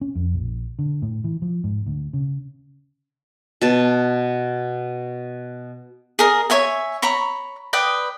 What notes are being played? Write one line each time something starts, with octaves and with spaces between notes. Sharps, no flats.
C#4
F2
A#1
D3
A2
E3
F3
G#2
D2
C#3
B2 A5
G#4 A#4 D#5
C#5 E5 G#5
C#5 A#5 B5 C#6
B4 D5 G5 D#6